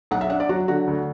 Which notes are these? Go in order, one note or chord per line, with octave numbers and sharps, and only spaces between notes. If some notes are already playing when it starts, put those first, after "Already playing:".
B1 F#5
E5
D4 F#5
D5
F#3 F#4
D3 F#4
D2